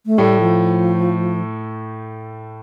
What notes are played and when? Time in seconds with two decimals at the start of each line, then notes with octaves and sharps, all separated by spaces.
0.06 A3
0.18 A2 G3 A3
0.40 F3